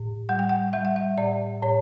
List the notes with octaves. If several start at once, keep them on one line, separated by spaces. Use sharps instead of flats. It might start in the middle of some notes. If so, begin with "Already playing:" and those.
Already playing: A2
G3 F#5
G5
F#5
G3 E5
F#5
E5
A2 D5
A2 C#5